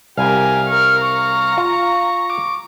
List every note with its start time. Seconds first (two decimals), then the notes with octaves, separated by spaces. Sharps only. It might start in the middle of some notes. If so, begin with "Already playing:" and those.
0.17 C2 G4 A#4 F5 G#5
0.67 A#4 C#6 F6
1.01 A#5 C#6
1.58 F4 F5
2.30 D6